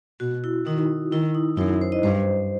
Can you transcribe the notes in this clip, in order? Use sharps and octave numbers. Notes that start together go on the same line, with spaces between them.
B2 F#4
E4
D#3 D#4
D#3 E4
D#4
F#2 E4
C5
D#5
G2 C5